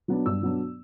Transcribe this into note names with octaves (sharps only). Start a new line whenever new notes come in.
F#3 B3 D4
G2 E6
F#3 B3 D4